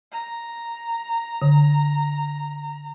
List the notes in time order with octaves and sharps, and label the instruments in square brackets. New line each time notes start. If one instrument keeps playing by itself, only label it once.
[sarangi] A#5
[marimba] D3